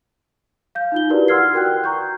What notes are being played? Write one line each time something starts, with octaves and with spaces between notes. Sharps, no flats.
F5 G6
D#4 F4 G7
E4 F#4 G4 A#4 B4 D5
F#5 C6 E6 F6 G#6 C7
F#4 A#4 G5 F#6
A#5 C#6 G6